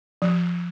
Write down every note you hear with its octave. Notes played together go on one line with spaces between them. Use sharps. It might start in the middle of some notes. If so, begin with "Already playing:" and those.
F3